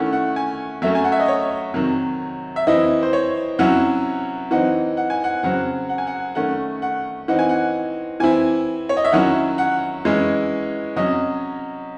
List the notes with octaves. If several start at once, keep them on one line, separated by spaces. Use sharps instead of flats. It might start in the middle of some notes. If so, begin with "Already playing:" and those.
Already playing: D#3 A3 C#4 E4 F#5
F#5
G#5
F#3 A3 C#4 E5
G#5
F#5
E5
D#5
C#5
C3 D#3 F#3
E5
E3 C4 E4 D#5
C5
C#5
C3 F#3 C#4 E4 F#5
E3 C4 D#4 F#5
F#5
G#5
F#5
C#3 F#3 C4 F#5
F#5
G#5
F#5
D#3 A3 C#4 F#5
F#5
E3 C4 D#4 F#5
G#5
F#5
E3 C4 E4 G#5
C#5
D#5
E5
D#3 F#3 C#4 E4 F#5
F#5
E3 G#3 C#4 E4
C3 F#3 C#4 D#5